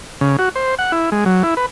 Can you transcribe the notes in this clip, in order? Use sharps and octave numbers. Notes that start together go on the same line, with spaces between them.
C#3
F#4
C5
F#5
E4
G#3
F#3
E4
B4